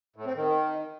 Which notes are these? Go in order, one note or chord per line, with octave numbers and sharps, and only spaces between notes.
A2
C4
D#3